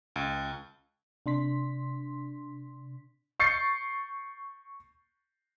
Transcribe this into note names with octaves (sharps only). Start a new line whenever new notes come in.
C#2
C3 D4 C6 B6
C#6 G6 A6 C7 C#7